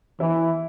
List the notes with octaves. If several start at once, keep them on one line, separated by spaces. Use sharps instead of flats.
E3 E4